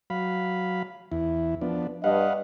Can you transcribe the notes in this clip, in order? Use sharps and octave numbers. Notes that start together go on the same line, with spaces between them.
F#3 F5 B5
E2 E4
F3 B3 D4
G2 B4 D#5 F5 F#5